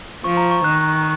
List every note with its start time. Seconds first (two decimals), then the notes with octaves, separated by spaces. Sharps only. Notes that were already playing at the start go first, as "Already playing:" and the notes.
0.24 F3 C#6
0.37 A#5
0.51 C#6
0.64 D#3 F#6